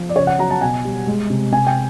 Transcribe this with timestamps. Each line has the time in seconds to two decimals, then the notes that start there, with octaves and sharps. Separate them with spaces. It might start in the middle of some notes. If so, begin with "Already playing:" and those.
Already playing: F3
0.09 D5
0.16 C#3 C#5
0.27 F#5
0.39 F#3 A#5
0.50 A5
0.61 B2 G#5
0.85 G3
1.07 G#3
1.30 C3
1.52 C3 G#5
1.67 G5